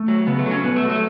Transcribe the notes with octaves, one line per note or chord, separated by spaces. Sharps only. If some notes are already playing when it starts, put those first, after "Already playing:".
Already playing: A3
F#3
C#3 B3
A3
F#3
C#4
B2 B3
A3
F#3
A3